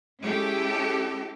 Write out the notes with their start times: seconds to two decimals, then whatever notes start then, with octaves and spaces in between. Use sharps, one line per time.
0.22 G#3 C#4 E4 G4 A4